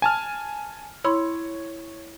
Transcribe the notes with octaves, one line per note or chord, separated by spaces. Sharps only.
G#5 A5 F6
E4 C#5 B5 C6